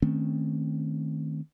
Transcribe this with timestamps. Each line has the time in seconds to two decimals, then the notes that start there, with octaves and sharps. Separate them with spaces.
0.02 D#3 A3 C4 C#4